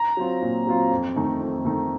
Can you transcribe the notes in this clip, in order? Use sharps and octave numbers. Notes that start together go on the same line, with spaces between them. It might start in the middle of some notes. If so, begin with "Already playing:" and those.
Already playing: A#5
F#3 C4 F4
A#2
F#3 C4 F4
F2
D#3 A3 D#4
F2
D#3 A3 D#4